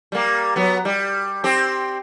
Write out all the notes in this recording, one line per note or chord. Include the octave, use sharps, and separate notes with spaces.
G3 A#3
F#3 B3
G3
C4 G4